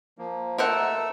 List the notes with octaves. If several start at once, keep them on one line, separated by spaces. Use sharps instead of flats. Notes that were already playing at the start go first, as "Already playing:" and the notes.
F3 A#3
A3 A4 A#4 C5 F#5 E6